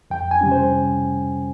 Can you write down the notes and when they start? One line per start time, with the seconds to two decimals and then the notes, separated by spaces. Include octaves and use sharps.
0.10 F2 G5
0.31 G#5
0.41 C3 G3 C#4
0.52 C5